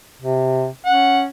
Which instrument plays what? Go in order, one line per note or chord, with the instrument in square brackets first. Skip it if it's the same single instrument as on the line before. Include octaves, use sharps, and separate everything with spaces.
[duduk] C3
[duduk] C#4 [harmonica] F#5